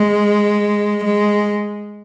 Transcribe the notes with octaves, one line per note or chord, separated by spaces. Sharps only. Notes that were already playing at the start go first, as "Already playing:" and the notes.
Already playing: G#3
G#3